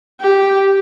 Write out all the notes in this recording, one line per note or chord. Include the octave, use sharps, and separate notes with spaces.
G4